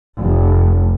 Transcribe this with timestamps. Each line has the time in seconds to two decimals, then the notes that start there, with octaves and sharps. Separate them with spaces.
0.19 F1